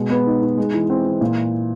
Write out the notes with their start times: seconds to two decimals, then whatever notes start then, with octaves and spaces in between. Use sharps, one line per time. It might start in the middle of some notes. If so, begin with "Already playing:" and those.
Already playing: B2 G#3
0.10 B3
0.26 D#4
0.42 D#4
0.57 G#3
0.74 E3
0.90 C4
1.05 E3
1.21 A#2